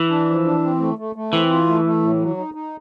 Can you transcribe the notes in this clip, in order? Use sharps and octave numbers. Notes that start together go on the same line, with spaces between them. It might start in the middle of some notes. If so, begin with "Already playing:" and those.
Already playing: E3
D4
F3
D4
C4
A3
A3
A3
E3 C4
F4
A3
A3
A2
F#3
D#4
D#4